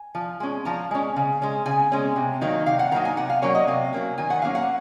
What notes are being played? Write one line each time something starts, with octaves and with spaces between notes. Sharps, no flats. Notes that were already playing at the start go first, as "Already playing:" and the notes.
Already playing: G#5
F3
G#3 C#4
F3 A#5
G#3 C#4
C#3
G#3 C#4
C#3 G#5
G#3 C#4
C3
D#3 F#3 A#3 D#4
C3 F5
F#5
D#3 F#3 A#3 D#4 A#5
G#5
C3 F#5
F5
F#3 A#3 C#4 C#5
D#5
C3 F5
F#3 A#3 C#4
D#3 G#5
F#5
F#3 A#3 C#4 F5
F#5